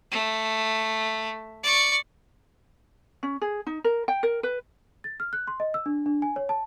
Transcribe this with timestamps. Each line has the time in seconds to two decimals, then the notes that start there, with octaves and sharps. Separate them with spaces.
0.11 A3
1.63 D5 C#6
3.23 C#4
3.41 G#4
3.67 D#4
3.84 A#4
4.08 G5
4.23 A#4
4.43 B4
5.04 A6
5.20 F6
5.33 F#6
5.47 C6
5.60 D#5
5.74 E6
5.86 D4
6.06 D4
6.22 G#5
6.36 C#5
6.49 A5